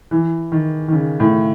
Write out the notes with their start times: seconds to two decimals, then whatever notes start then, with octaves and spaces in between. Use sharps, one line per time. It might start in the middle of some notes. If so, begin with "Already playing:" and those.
0.11 E3
0.52 D#3
0.88 D#3
0.93 C#3
1.20 A2